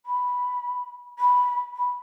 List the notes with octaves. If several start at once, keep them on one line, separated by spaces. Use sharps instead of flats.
B5
B5
B5